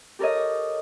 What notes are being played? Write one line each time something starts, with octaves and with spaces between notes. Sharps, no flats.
G4 A4 A#4 C#5 D#5